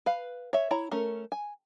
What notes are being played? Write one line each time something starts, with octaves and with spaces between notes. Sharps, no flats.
B4 F5
C#5 E5
E4 C#5 A#5
A3 C#4 A#4
G#5